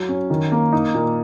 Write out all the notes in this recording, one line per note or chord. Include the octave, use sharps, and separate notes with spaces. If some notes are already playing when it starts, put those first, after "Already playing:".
Already playing: F#3
C#4
D#3
A#3
D#4
A#2